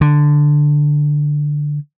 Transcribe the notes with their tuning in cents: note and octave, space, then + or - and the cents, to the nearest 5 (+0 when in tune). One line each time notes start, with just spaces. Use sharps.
D3 +5